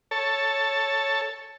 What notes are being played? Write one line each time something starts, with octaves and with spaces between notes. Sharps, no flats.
A4 C#5 A5